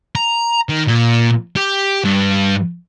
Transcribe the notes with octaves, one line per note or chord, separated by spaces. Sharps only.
A#5
D#3
A#2
G4
G2